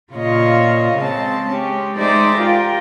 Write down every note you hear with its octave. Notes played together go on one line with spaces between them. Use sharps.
A#2 C#3 F4 C#5 D#5
C#3 G#3 C4 A5
G#3 C#4 G4
G#3 D#4 C5 D5 E5 D6
F4 G4 A#4 G5